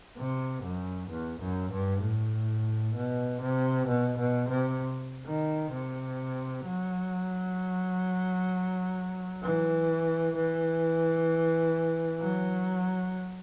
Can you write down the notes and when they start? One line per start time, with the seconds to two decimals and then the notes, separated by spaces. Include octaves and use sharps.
0.17 C3
0.64 F#2
1.10 E2
1.40 F#2
1.72 G2
2.02 A2
2.95 B2
3.41 C3
3.88 B2
4.18 B2
4.49 C3
5.27 D#3
5.72 C3
6.65 F#3
9.43 E3
10.36 E3
12.21 F#3